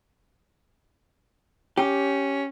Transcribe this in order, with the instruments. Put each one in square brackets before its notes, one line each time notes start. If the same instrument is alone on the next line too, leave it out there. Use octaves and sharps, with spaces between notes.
[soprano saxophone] C#4 [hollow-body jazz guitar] G4